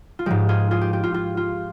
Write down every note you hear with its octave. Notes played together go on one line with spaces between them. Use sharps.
F4
G#2 F3 G#3 G4
F4 G#4
F4 G#4
G4
G4
F4
F4
F4